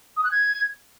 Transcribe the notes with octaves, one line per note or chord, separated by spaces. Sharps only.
D#6
F#6
G#6